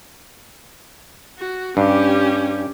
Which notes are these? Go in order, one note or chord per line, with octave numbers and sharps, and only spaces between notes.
F#4
G2 C#4 G4